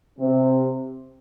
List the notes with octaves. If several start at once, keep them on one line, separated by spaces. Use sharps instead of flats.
C3 C4